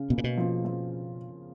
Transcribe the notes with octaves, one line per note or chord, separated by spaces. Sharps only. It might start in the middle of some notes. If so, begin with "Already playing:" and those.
Already playing: C#3
B2 A#3
A#2
B2
F3
F3